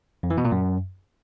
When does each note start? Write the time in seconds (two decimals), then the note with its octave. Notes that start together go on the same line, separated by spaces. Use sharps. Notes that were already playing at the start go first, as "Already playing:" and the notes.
0.23 F2
0.30 E3
0.38 B2
0.45 A#2
0.52 F#2